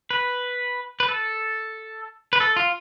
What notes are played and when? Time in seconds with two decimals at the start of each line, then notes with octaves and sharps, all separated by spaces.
0.10 B4
1.00 B4
1.09 A4
2.33 B4
2.40 A4
2.56 F4